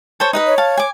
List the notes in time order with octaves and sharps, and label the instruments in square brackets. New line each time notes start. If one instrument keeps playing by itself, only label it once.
[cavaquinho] A4 C5 C#5
D#4 B4 D#5
[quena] C#5
[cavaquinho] F5 A5
G#5 D6